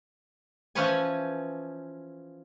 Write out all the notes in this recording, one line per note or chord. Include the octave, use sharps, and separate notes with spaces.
E3 F3 C#4 B4 C#5 G#5